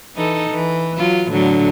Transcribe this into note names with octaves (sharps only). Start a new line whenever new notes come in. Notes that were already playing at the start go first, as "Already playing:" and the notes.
E3 D#4 A4
E3
F#3 F4
A2 D3 F#3